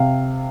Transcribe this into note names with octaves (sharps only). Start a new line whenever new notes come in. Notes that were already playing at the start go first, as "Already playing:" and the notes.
Already playing: C3 F5